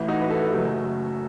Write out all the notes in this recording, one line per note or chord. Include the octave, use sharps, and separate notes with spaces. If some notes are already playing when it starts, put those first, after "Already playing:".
Already playing: A1 A2 E3
D#4 F#4
B4
F#4 A4
F#1 F#2 F#3 A3